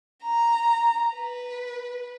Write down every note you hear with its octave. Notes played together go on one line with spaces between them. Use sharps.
A#5
B4